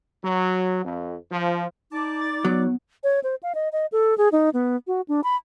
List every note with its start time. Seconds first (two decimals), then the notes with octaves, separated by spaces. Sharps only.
0.24 F#3
0.85 F2
1.31 F3
1.92 D#4 D5 A5 D6
2.21 A6
2.45 F#3 B3
3.04 C#5
3.24 C5
3.43 F5
3.55 D#5
3.73 D#5
3.92 A4
4.18 G#4
4.32 D#4
4.54 B3
4.87 F#4
5.08 D4
5.24 B5